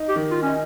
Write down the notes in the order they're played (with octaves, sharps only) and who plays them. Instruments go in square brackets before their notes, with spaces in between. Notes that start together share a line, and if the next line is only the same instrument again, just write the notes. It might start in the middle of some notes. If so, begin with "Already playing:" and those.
Already playing: [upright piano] D#4
[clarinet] G4
[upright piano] D#3
[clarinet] F4
[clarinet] C#4 [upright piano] D#4